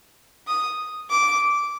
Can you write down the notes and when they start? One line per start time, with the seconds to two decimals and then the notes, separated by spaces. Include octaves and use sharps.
0.47 D#6
1.10 D6